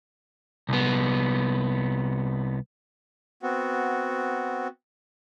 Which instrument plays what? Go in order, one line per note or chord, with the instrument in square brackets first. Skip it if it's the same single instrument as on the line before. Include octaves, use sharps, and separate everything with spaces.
[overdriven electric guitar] C2 B3
[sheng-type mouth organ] B3 C4 F#4